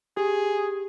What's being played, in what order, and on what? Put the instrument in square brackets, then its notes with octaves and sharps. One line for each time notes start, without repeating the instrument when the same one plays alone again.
[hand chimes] G4 [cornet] G#4